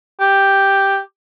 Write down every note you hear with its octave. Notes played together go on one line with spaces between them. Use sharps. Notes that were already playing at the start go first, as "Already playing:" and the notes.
G4